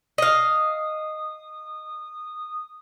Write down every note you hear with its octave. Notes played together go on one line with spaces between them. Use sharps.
D#5 F5 D#6